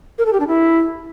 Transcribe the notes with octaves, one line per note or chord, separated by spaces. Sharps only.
A#4
A4
G4
D4
E4